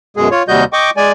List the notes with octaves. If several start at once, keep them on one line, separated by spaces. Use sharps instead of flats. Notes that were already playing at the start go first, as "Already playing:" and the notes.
F#2 B2 G#3 G#4
F4 C#5
D#2 C3 G3 F#4 D#5 G6
D#5 G5 C#6 D6
G#3 D5 G#5